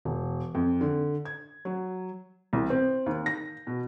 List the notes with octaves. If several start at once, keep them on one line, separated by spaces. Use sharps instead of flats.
E1
F2
D3
G#6
F#3
C2
C4
D#2
A#6
B2